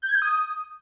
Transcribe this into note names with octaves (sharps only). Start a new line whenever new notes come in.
G6
G#6
G6
D#6